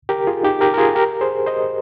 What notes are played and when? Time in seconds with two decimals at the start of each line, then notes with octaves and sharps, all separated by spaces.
0.09 G4 A#4
0.27 F4 G#4
0.43 D#4 G4
0.61 G4 A#4
0.74 A#4
0.78 F4 G#4
0.95 G4 A#4
1.21 G#4 C5
1.46 C5 D#5